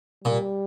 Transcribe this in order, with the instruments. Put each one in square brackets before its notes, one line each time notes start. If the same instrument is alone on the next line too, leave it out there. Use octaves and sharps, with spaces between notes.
[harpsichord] A#2 [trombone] G3